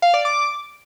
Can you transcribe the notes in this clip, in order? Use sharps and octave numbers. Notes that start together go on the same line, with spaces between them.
F5
D5
D6